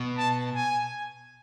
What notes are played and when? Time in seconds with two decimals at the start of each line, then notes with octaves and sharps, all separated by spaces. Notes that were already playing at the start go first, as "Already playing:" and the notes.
Already playing: B2
0.17 A5
0.55 G#5